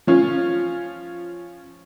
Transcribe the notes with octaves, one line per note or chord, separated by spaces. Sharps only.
F3 C#4 F4